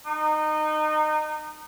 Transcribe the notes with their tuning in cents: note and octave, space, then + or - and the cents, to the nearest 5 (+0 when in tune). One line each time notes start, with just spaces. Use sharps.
D#4 -25